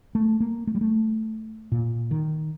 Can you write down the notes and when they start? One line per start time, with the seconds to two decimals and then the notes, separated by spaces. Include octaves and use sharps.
0.15 A3
0.40 A#3
0.67 A3
0.75 G3
0.81 A3
1.72 A#2
2.11 D#3